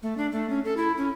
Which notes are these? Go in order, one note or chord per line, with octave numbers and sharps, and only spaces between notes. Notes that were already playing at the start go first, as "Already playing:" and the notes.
A3
D4
A3
C#4
A4
E4
C#4